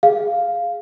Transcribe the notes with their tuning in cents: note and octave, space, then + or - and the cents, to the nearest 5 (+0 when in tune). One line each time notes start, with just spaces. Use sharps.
G#4 +0 F5 +0